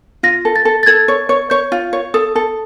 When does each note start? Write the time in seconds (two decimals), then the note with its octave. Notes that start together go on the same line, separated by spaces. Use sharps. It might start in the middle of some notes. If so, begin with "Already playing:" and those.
0.23 F4 A#6
0.45 A4
0.56 A6
0.65 A4
0.83 A6
0.86 A4 G#6
1.08 C#5
1.29 C#5
1.50 C#5 G6
1.72 F4
1.93 C#5
2.14 A4 D#6
2.36 A4